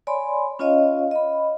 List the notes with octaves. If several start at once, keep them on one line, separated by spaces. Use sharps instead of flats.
C#5 D5 G#5 B5 C6
C#4 F4 C#5 D#5 F5
D#5 B5